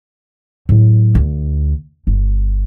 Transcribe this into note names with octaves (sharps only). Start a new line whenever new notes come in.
A2 F#3
D2
G1